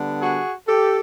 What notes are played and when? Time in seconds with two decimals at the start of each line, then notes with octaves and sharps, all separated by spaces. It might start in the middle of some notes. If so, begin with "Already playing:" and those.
Already playing: D3 G3 B3
0.21 F#4 G#4
0.67 G4 A4